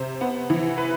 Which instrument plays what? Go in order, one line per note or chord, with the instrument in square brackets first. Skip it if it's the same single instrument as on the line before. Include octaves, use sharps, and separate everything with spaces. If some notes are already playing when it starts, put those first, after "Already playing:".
Already playing: [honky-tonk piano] C3 C5
B3
E3
B4